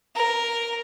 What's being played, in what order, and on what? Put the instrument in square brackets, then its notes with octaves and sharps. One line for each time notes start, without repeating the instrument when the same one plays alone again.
[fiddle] A#4